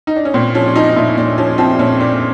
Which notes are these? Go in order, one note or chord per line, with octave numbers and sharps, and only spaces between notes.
D#4
D4
C#4
A#2 C4
F3 C#4
D4
F3 D#4
D#4
A#2 E4
A#2 D4
F3 C#4
F3 C4
A#2 C#4
A#2 D4